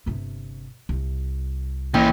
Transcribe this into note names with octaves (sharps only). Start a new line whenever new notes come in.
G1 C3
C2
E3 A#3 C#4 G5